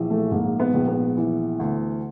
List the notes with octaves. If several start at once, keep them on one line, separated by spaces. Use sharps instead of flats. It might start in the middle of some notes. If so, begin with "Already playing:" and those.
Already playing: A#1 E3
A3
G#2 A#3
B3
A#1
B3
E3
D2